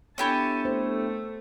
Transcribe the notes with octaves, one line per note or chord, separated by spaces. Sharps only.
B3 D4 E4 G4 A4 C#5 G#5 A5
A3 C5